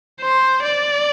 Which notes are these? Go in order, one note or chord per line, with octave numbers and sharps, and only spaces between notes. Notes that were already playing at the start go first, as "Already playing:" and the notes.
C5
D5